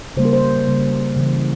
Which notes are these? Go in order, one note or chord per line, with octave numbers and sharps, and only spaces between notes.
C#3 G3 A#3 C5
A#4
C5
C#3 G3 A#3
C#3 E3 G3